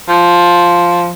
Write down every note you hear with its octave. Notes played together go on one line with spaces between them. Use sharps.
F3